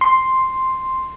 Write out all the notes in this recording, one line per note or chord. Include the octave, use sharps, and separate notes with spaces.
C6